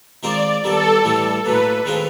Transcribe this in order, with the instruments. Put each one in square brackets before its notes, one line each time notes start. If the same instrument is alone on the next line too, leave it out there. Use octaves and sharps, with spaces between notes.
[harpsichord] D#3 G#3 C4 F4 A#4 [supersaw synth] D5
[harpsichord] D#3 G3 B3 [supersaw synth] A4
[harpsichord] A2 E3 G3
[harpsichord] A2 F#3 A#3 [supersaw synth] B4
[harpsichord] D#3 G#3 C4 F4